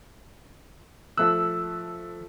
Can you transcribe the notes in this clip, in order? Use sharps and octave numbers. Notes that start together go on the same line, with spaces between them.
F3 A3 E6 F#6